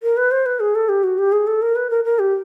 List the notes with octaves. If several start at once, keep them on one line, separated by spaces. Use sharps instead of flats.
A#4
B4
C5
B4
G#4
A4
G4
F#4
G4
G#4
A4
A#4
B4
A#4
A#4
G4